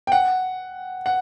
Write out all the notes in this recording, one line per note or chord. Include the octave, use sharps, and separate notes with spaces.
G5
F#5
F#5